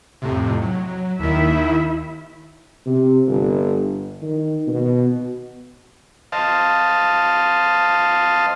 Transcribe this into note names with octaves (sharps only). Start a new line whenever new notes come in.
F2 A2 C3
F#3
D#2 D#3 E4 E5
C3
G1
D#3
B2
C5 D#5 F5 A5